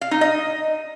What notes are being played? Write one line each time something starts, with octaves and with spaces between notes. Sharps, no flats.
F5
D#4
D#5